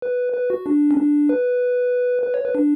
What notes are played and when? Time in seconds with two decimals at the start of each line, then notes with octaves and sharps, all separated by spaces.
0.02 B4
0.34 B4
0.50 F#4
0.66 D4
0.91 C#4
0.97 D4
1.29 B4
2.23 B4
2.34 C#5
2.45 B4
2.55 D4